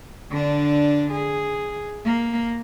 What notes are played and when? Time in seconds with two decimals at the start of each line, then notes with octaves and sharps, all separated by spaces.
0.31 D3 D4
1.12 G#4
2.05 A#3